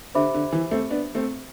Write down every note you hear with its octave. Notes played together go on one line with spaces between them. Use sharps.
D3 G4 C5 E5 B5 D6
D3
E3
A3 C4
B3 D4
A3 C4